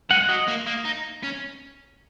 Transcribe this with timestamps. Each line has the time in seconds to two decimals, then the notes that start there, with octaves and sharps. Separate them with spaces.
0.10 G#3 F#5
0.29 F#3 D#5
0.48 A#3
0.67 A#3
0.85 D#4
1.23 C#4